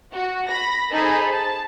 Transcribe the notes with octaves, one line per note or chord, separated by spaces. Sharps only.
F#4
B5 A#6
D#4 G#4 A4 C5 G#5 B5
A5